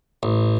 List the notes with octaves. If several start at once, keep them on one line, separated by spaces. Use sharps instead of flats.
A1